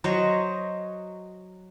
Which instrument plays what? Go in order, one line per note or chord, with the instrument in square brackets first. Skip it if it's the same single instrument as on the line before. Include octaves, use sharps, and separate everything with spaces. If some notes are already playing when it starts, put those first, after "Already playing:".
[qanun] F#3 C5 C#5 D#5